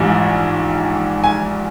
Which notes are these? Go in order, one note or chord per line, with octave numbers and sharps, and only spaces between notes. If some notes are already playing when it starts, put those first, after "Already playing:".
Already playing: A#1 G#2 E3 G3
G#5